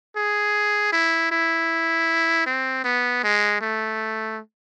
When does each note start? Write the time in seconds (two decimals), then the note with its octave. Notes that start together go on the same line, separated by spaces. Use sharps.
0.17 G#4
0.92 E4
1.32 E4
2.46 C4
2.84 B3
3.24 G#3
3.61 A3